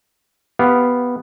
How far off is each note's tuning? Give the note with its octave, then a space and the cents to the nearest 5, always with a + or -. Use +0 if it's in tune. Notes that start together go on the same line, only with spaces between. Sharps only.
B3 +0 G4 +0 F5 +0